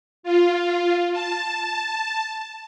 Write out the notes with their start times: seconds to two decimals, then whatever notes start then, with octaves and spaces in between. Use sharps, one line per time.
0.23 F4
1.12 A5